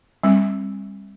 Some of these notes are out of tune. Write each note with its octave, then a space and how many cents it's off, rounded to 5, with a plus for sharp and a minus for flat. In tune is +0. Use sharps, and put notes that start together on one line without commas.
G3 +30 C4 +35